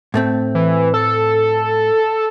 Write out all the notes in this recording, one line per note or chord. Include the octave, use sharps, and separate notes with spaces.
A2 A3 C4
E3
A4